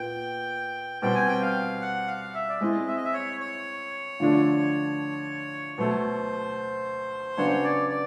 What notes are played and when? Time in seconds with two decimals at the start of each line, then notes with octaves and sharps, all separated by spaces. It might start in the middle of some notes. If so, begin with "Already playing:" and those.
Already playing: A#2 B3 G5
1.02 B2 G3 C4 G5
1.15 G#5
1.28 G5
1.42 F5
1.81 F#5
2.07 F5
2.34 E5
2.49 D5
2.61 G#3 C4 E4 D#5
2.87 E5
2.96 D#5
3.05 E5
3.13 C#5
3.40 C#5
4.20 D3 F3 A3 D4
5.78 B2 F#3 A3 C5
7.37 C#3 F#3 B3 D4 C#5
7.64 D5
7.90 D5